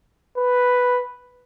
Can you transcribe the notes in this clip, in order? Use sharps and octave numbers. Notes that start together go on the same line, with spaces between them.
B4